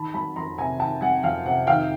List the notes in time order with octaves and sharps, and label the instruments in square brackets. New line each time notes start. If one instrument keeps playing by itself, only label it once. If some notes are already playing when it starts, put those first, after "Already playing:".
Already playing: [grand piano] D#3 [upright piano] A5 B5
[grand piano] F#3 [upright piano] A5 B5
[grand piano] F2 [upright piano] A#5 C6
[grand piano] C3 [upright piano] G#5 A#5
[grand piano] D#3 [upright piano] G5 A5
[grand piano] F#3 [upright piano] F#5 G#5
[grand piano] F2 [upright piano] F5 G5
[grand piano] C3 [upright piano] F#5
[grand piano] D#3 [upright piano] F5 G5